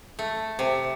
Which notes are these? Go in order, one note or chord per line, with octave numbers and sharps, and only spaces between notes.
A3
C3